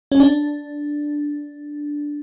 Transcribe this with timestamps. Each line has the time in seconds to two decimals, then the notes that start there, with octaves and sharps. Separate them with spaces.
0.12 C#4
0.20 D4